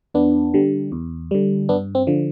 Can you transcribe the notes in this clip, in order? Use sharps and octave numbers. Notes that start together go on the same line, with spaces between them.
E2 B3 D4
D3 G3
E2
D3 G3
G2 B3 D4
C4
D3 F3